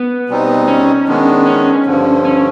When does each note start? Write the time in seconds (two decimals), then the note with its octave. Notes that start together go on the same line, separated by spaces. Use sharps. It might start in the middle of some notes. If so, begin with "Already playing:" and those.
Already playing: B3
0.30 B2 G3 C4 D#4
0.68 C#4
1.07 D#3 G#3 B3 D4
1.46 C#4
1.86 G2 D3 F3
2.25 C#4